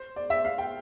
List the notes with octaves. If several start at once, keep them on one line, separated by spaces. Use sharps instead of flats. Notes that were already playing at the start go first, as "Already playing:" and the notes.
Already playing: C5
D5
E5
F5
G5